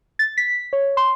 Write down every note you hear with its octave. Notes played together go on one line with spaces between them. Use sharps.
A6
B6
C#5
C6